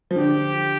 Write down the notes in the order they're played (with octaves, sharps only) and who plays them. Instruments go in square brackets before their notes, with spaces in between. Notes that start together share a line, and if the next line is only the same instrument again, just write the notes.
[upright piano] F3
[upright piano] D3 [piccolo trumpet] G4